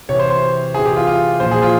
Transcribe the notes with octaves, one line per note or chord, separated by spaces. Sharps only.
C3 E3 C#5
C5
C5
C3 E3 G#4
G4
F4
F4
A#2 F3 C5
G#4
F4